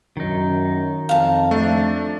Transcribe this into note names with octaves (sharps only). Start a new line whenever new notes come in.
F#2 D#3 D#4
F2 F5 A5
A3 D4